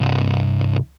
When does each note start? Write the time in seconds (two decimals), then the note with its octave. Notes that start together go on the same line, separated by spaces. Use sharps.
0.01 C2 G2